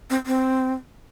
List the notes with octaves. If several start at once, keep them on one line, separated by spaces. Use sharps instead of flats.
C4
C4